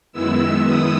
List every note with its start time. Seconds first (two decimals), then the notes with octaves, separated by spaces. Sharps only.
0.13 F#2 D#3 G#3 B3 E4 E6
0.67 D#6